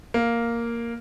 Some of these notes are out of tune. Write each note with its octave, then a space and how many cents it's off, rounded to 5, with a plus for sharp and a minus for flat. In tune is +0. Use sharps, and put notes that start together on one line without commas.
A#3 +0